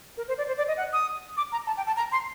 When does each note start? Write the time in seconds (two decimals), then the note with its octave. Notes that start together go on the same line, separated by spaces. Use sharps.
0.17 A#4
0.28 C5
0.38 D5
0.47 C5
0.58 D5
0.68 D#5
0.77 F#5
0.93 D#6
1.37 D6
1.52 A#5
1.67 A5
1.77 G5
1.87 A5
1.97 A#5
2.12 C6